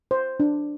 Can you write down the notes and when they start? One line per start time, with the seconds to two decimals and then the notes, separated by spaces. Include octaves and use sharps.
0.11 C5
0.40 D4